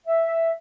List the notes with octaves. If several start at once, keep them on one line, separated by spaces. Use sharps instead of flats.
E5